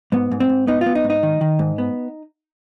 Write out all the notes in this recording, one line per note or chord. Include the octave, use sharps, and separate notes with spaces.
G#2 B3
G#2
C4
G#2
B3 D#4
F4
B3
D#4
G#2
D#4
D#3
D#3
G#2
B3